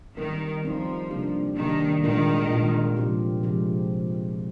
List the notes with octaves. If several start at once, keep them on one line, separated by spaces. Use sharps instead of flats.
D#3 G3 C4 D#4 A#4
F3 G3 C4 D#4 A#4
C3 G3 A#3 D4 G4
C3 D#3 G3 A#3 D4 G4
A#2 D#3 G#3 D4 F4 A#4
A#2 G#3 D4 F4 A#4
C3 F3 G#3 C4 G4
C3 F3 G#3 C4 G4